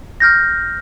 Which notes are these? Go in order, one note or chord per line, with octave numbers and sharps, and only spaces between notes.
F6 G6 A#6